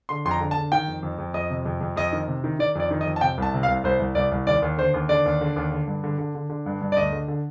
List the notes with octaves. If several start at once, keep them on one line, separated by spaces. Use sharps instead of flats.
D3 C6
F2 C6
A#5
D3
A5
D3
D#3 G5
F2
F2
F2
F2 D#5
C3
F2
F2
F2 D#5
D#3
C3
D#3
D#3 D5
F2 D5
D#3
D#5
F2
A5
C3 G5
C2 A5
C3
F5
C2
C2 C5
C2
C2 D5
C2
D#2 D5
D#2
D3 C5
D#2
D3 D5
D#2
D3
D#2
D3
G2
D3
D3
D3
D3
G2
G2
D5
D2 D#5
D3
D3